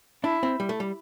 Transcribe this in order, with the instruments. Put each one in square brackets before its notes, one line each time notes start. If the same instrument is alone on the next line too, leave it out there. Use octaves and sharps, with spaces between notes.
[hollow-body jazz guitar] D4 [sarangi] E4
[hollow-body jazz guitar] C4
G3
A3
G3